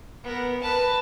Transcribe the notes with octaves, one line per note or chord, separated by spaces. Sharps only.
B3 A#4
B4 A5